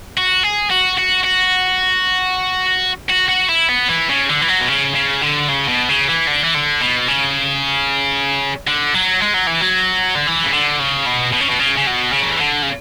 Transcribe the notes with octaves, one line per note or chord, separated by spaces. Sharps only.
F#4
G#4
F#4
F#4
F#4
F#4
F#4
E4
B3
E3
C#3
D3
E3
F#3
B2
C#3
C#3
D3
C#3
B2
C#3
E3
D3
E3
D3
B2
C#3
D3
F#3
G#3
F#3
E3
F#3
D3
E3
C#3
D3
C#3
B2
B2
C#3
B2
C#3
C#3
B2
C#3
F#3
E3
D3
C#3